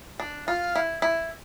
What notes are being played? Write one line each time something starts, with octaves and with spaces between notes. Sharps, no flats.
D4
F4 F5
E4
E4